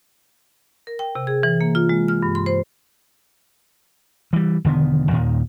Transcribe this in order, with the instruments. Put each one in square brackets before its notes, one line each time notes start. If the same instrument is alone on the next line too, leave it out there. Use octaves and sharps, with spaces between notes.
[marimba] A#4
G5
C3
G#4
E3
A#3
F4
G#3
F6
G2
C6
C5
[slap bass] E3 G3
E1 D3 D#3 B3
D#2 A#2 D#3